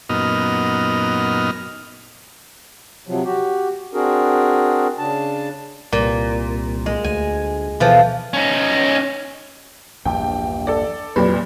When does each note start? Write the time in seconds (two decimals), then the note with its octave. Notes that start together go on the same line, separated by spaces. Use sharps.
0.09 F#2 A#2 B3 D#4 D#5 F6
3.07 C3 F3 F#3
3.24 F#4 G4
3.94 C4 D4 F#4 G#4 A#4
4.98 C#3 D4 A5
5.92 C2 A#2
6.86 G#3
7.04 D2 G#5
7.80 B2 E3 F3 A4
8.33 C#4 D#4
10.05 A#1 E2 G2 G5
10.67 A4 D5
11.16 C2 F2 A#2 F#3 G3 B4